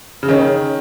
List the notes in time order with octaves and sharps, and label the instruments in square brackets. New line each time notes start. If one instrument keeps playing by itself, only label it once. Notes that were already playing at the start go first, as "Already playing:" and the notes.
[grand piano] C#3
[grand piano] D#3 [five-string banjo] C#4 G#4 C#5